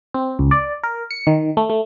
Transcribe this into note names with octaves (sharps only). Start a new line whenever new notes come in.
C4
C#2
D5
A#4
C#7
D#3
A3
A3